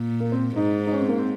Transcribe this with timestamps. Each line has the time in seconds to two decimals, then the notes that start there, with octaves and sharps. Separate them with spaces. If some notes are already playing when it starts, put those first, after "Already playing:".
Already playing: A#2
0.20 A#3
0.32 C4
0.55 G#2 D#4
0.87 D#4
0.91 C#4
1.00 C4
1.09 A#3
1.18 C4